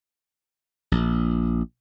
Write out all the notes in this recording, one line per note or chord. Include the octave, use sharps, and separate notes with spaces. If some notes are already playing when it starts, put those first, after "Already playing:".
A#1